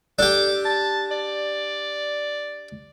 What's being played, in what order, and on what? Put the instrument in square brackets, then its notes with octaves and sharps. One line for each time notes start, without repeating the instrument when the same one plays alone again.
[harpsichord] D4 G4 [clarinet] A4
[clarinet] A5
D5